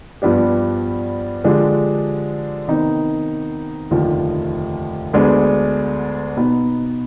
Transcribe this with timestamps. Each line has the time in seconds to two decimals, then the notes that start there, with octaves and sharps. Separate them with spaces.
0.22 G2 F3 B3 D4 G4
1.44 D3 F3 G#3 D4 G4
2.68 C3 D#3 B3 D#4
3.91 F1 D#2 D3 F3
5.13 D2 D3 G#3 B3 D4
6.37 B2 B3 D#4